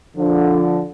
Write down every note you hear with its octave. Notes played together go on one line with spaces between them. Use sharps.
D3 F3